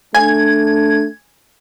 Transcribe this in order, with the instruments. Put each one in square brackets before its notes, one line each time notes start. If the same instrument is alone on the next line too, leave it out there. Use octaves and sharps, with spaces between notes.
[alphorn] A3 [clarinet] D4 [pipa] G#5 [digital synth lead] G#6